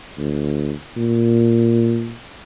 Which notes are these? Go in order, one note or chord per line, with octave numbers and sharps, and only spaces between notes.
D2
A#2